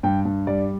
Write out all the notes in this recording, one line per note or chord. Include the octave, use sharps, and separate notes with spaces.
G2 G5
G2
G3 D5